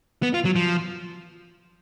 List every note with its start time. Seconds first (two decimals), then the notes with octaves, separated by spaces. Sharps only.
0.23 B3
0.34 F4
0.45 F#3
0.56 F3